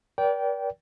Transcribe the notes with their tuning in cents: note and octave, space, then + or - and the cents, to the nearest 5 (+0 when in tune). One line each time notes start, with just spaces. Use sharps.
A#4 +45 D5 -30 G5 -10